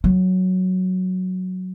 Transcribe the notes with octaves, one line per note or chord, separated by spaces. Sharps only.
F#3